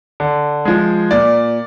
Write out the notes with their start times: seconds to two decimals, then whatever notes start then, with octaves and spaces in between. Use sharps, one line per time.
0.20 D3
0.65 F3 G#3
1.11 A#2 D5